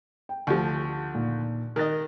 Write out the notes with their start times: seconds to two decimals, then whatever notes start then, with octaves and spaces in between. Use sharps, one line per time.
0.29 G5
0.47 D2 F3 A5
1.15 A#2 D#3
1.76 D#3 A#4 D#5 F#6 A6